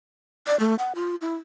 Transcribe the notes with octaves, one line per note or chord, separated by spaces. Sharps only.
D5
A3
F#5
F4
E4